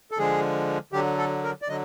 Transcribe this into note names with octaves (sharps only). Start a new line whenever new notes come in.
A4
D3 F3 G#3 G#4
D3 F#3 G4
A4
A#4
D5
D3 F#3 D#5